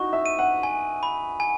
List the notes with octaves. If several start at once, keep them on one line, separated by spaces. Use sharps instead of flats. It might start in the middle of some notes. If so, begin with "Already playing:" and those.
Already playing: D#4 E4 F#4 C#6
E5
D#7
F#5
G#5
B5
G#5